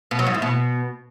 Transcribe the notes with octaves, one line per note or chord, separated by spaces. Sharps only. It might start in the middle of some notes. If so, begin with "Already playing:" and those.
B2
F#3
G#2
E2
B2